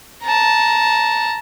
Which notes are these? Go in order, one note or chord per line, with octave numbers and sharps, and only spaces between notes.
A5 A#5